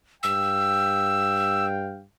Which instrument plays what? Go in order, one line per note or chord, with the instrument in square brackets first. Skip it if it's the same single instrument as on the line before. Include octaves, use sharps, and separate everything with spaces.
[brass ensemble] G2 F5 G5 [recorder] E6